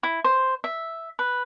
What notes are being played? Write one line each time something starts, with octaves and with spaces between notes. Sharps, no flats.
E4
C5
E5
B4